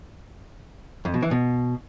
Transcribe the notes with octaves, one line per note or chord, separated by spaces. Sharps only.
F2
B2
E3
B2